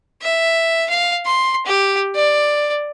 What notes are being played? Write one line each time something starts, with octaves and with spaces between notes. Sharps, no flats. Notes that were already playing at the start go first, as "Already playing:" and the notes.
E5
F5
C6
G4
D5